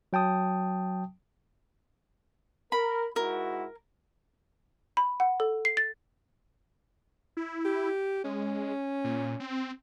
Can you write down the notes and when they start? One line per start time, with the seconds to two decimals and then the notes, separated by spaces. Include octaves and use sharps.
0.13 F#3 G5 A5 D#6
2.72 A#4 B5
3.16 G#2 E4 F#4 A#4
4.97 B5
5.20 F#5
5.40 A4
5.65 C7
5.77 A6
7.37 E4
7.65 G4
8.24 G#3 C#4
9.04 A#2
9.40 C4